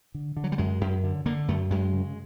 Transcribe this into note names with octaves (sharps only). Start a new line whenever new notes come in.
D3
D3
F#3
G3
F#2 G#3
F#2
D3
D3 A#3
F#2 A3
F#2 G#3
C#3